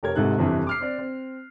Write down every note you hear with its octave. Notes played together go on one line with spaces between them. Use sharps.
F1 G4 A#4 C#5 G#6
G#1 G#2 C3 D#4 A4 F#6
G1 F2 C3 E3
D6 F6 C7
C4 D5
C4